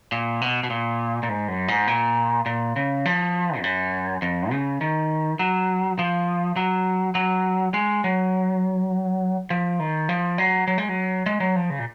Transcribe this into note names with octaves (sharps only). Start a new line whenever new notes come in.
A#2
B2
B2
A#2
A#2
G#2
F#2
G#2
A#2
A#2
C#3
F3
F2
F#2
F2
C#3
D#3
F#3
F3
F#3
F#3
G#3
F#3
F3
D#3
F3
F#3
F#3
G#3
F#3
G#3
F#3
F3
C#3
A#2